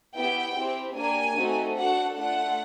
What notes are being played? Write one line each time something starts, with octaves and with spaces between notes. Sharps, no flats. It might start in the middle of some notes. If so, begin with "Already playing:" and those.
B3 E4 G4 G5
C4 E4 G4
A#3 D4 G4 G#5
A3 C4 D#4 F#4 A4
D4 F#4 A4 F#5
A3 D4 F4 F#5